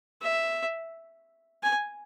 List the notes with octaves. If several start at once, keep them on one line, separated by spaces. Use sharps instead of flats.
E5
G#5